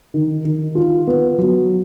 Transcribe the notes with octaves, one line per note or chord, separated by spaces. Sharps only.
D#3
D#3
F4
B3
F#3